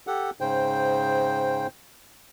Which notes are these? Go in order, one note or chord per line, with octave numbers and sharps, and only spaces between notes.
G4 A4 F#5
G#2 C#3 C5 G5